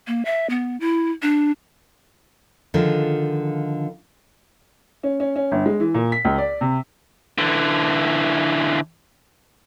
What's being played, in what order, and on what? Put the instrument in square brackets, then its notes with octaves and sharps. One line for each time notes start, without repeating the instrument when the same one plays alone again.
[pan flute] A#3
E5
B3
E4
D4
[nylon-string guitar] D3 D#3 F3 F4 G#4
[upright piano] C#4
C#4
C#4
G1
G#3
E3
A#2
B6
C#2
D5
C3
[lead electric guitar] D3 E3